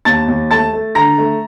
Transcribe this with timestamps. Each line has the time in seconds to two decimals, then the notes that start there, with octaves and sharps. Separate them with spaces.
0.05 D#2 A5 A6
0.28 D#2
0.51 A3 A5 A6
0.73 A3
0.95 D3 A#5 A#6
1.18 A3